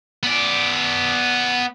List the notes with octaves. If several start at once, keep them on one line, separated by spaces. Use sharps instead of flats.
B3 D5